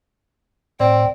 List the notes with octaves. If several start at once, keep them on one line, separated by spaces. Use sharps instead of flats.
A2 C4 D5 G5